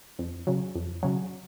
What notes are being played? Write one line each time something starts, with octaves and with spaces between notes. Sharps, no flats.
F2
C#3 F#3
F2
C#3 F#3